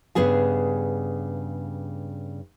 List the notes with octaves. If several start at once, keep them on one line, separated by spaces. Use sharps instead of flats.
G2 C#3 B3 G#4 G#5